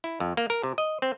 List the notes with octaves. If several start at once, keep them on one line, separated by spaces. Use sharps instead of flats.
E4
F2
A#3
A#4
C3
D#5
C4